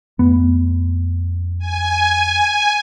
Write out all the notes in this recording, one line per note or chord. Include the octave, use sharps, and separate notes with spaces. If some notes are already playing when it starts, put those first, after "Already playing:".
F2 A3 B3
G#5